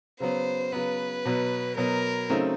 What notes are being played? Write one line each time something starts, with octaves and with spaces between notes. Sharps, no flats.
C#3 F#3 B3 C5
C#3 F#3 B3 B4
B2 F#3 B3
B2 F#3 B3 A#4
C#3 F#3 A3 C4 D#4